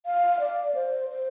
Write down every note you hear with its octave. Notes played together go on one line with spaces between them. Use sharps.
F5
D5
C5
C5